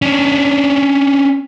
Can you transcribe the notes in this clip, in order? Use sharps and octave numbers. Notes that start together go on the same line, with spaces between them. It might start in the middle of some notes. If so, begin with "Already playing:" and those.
C#4 D4